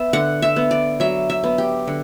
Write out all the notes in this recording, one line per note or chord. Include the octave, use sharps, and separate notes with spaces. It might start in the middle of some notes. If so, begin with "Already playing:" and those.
Already playing: B3 E5
D3 F#5
E5
B3
D5
F#3 E5
E5
B3
G4
D3